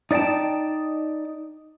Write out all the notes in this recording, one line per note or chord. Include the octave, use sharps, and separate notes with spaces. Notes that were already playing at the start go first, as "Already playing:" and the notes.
D#4 D5 D#5 G5 A5